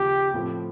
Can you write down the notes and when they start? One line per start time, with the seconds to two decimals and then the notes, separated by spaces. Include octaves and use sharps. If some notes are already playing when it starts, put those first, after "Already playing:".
Already playing: D#2 C#3 F3 G4
0.34 A2 F3 A3 C4